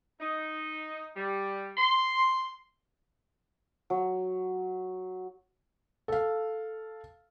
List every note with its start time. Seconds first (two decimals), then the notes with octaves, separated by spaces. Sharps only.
0.20 D#4
1.16 G3
1.77 C6
3.90 F#3
6.08 A4 F5